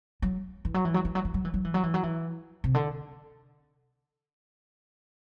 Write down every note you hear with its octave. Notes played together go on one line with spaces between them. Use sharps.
F#3
E3
F#3
E3
F#3
E3
F#3
E3
F#3
E3
F#3
E3
F#3
E3
F#3
E3
C3
D3